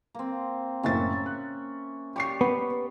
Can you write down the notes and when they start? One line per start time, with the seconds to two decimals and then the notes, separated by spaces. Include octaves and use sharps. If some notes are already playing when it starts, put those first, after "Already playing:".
0.15 A#3 C4
0.83 F#1 A2 C#4 E5 A6
1.26 F#6
2.16 G4 C#5 D5 G5 C#6 C7
2.41 B3